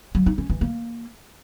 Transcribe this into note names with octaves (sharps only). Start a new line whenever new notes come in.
F#3
D#4
C#4
E3
A#3